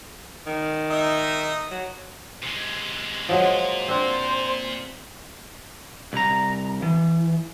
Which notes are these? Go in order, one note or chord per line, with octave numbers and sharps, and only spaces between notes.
D#3
D#4 D#5 E5
F#3
C3 G#3
A#2 F3 F#3 G#3
C4 D4 C5
C2 A#5
E3